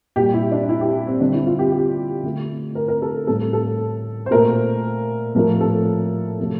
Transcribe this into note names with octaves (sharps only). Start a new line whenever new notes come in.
A#2 G3 G4
E4
D4
E4
G4
C4
D3 G3 D4
E4
F4
G4
G4
D3 A3
A#4
A#4
A4
A2 G3 A4
A4
C5
A#2 A3 A#4
A2 F3 A3 A#4
A4
C3 F3 A3